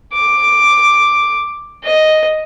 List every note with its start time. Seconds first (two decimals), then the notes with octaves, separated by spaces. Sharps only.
0.13 D6
1.84 D#5